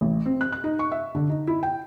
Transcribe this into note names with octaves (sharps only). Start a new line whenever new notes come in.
A1
C4
F#6
F#6
D#4
C#6
E5
D3
D#4
E4
G5